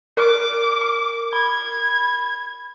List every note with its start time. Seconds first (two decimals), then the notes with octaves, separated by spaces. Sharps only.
0.17 A#4 D6 F6
1.33 B5 G#6